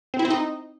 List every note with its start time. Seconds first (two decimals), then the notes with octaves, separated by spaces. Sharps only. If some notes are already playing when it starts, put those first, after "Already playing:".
0.14 C4
0.19 E4
0.25 C4
0.30 D#4